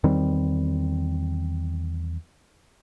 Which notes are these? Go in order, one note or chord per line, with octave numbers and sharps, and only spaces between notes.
E2 D#3 G3 C4